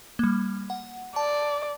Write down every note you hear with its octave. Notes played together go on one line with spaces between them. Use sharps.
G3 A#3
F#5
D5 A5